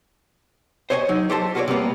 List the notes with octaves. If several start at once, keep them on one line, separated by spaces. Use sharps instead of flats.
C5 C#5 D#5 G5 G#5
F#3 D#4
G4 A4 C5 D#5 G5 A5
F4 F#4 G#4 B4 C#5 D5
C3 G3 A#3 B3